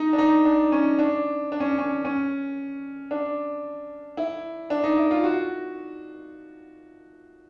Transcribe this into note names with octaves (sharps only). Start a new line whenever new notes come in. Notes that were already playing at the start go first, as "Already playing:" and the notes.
Already playing: D#4
D4
D#4
D4
C#4
D4
D4
C#4
C#4
C#4
D4
E4
D4
D#4
E4
F4
F#4